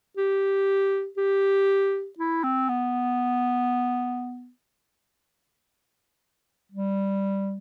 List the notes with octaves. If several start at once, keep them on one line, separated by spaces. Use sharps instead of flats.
G4
G4
E4
C4
B3
G3